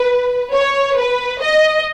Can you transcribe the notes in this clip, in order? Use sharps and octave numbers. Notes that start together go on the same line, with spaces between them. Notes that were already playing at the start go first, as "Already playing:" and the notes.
Already playing: B4
C#5
B4
D#5